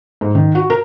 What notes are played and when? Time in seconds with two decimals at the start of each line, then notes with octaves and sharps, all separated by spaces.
0.21 G#2
0.35 D#3
0.55 F#4
0.70 A#4